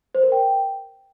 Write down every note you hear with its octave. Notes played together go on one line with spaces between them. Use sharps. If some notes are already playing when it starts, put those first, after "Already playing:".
C5
A#4
G5